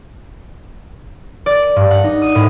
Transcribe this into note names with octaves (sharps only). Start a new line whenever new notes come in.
D5
D7
G2
F#5
D#4
D#6
A2